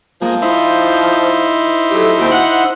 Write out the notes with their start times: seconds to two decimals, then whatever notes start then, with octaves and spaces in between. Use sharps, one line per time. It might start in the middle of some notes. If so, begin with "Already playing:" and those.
0.22 F3 G#3 A#3
0.42 D#4 E4 C5
1.91 F#3 A3 G4
2.18 D#2 C4 F#4
2.31 F#5